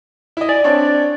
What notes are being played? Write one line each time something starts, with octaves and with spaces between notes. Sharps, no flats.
E4 D#5
D5 G#5
C4 D4 C#5